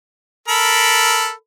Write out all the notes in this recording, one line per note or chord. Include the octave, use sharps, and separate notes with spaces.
A4 A#4 B5